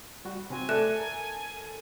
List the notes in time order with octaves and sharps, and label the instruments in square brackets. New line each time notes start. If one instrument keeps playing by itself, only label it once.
[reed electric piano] G3 F#4
[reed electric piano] C3 C4 F#4 [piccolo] G#5
[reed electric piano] A3 C5 D5 [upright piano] A4 [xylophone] E5 F#6 E7
[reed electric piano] A#4